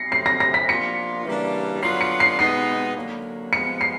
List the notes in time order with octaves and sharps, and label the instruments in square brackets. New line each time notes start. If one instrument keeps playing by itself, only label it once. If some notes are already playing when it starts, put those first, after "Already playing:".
Already playing: [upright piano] A#6 C7 C#7
[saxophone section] C#3 F#3 A3 C4 [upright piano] C7
[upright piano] A#6
A#6
B6
[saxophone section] F3 A#3 D4 F4 [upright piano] C#7
[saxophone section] C#3 E3 G3 A#3 D4
[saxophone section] D3 F#3 B3 D4 F4 [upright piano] C7
[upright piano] C#7
C7
[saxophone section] B2 G#3 B3 D#4 [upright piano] C7
[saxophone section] D3 F#3 A#3
[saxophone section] F3 G#3 B3 [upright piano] C#7
[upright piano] C7